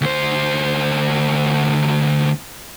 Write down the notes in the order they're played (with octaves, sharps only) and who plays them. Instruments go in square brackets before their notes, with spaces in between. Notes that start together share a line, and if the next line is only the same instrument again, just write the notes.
[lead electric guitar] D2 C5